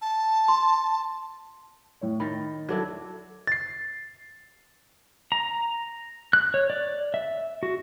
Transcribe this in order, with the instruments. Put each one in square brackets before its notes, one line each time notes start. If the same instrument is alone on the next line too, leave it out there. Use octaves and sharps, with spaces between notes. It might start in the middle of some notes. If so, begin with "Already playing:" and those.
[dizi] A5
[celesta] C6
[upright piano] A2 C#5
[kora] D#3 [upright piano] B5 A6
[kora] F#3 D4 E4 [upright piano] A4 G#6
[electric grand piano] A6 C7
[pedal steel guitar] A#5
F#6
C#5
D5
E5
F#4